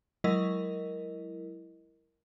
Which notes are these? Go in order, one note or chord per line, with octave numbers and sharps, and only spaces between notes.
F#3 G#3 E4 A#4 D#5